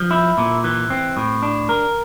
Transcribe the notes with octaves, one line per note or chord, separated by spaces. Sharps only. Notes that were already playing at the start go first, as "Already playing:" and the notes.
Already playing: F3
E4
A#2
E3
C4
A2
D4
A#4